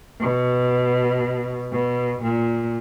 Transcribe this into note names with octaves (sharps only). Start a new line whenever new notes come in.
B2
B2
A#2